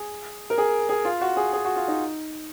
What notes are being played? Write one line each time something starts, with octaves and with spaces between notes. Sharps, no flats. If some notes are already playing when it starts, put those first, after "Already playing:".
Already playing: G#4
A#4
G#4
G#4
F4
F#4
G#4
G#4
F#4
F4
D#4